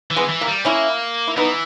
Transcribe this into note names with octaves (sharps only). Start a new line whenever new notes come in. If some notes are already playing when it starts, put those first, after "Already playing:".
E3
G#3 B3
E3
A#3
G3
A#3 C#4 E4
E4
E3 B3 D#4